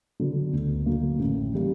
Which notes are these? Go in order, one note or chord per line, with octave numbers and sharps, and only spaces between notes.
D3 F#3 B3
D2
D3 F#3 A#3
A1
E3 G3 A#3